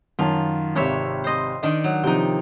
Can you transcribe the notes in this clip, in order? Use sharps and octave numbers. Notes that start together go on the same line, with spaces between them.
F#2 D#3 F4 A5
G#1 C3 G4 C#5 E5
C5 D#5
D#3 D4 D#5
F#3
C3 F3 D#4 G5